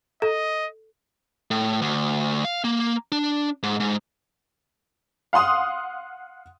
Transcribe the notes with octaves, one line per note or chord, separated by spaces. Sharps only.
A4 D#5
A2
D2
F5
A#3
D4
G#2
G#2
F5 F#5 C6 D#6